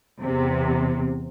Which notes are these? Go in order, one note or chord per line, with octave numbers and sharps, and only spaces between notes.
E2 C3